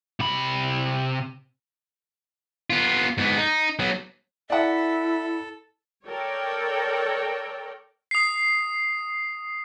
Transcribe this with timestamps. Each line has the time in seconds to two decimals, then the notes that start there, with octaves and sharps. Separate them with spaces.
0.20 C3 B5
2.70 B3 F4
3.18 G#2 B3
3.37 D#4
3.79 F#3 B3
4.50 E4 A4 D5 E5 F#5
6.07 A4 A#4 C#5 D5 G5
8.11 D#6 C7